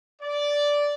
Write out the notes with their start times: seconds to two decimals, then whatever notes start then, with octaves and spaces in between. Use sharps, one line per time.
0.22 D5